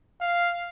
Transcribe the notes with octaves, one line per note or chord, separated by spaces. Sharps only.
F5